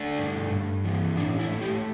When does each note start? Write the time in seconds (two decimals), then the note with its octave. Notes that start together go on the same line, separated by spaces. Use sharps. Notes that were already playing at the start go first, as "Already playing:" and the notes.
Already playing: A3 D4
0.18 G2
0.51 G2
0.84 E3
1.17 A2 D4
1.39 E4
1.50 A3
1.61 G4